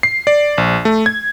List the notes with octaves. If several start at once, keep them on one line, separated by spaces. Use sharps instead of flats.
C7
D5
A#1
A3
G#6